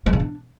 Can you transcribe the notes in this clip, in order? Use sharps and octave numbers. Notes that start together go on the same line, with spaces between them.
G#3
C#3
D4